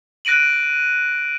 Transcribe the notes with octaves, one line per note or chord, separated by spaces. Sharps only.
F#6 A#6 D7 D#7 F#7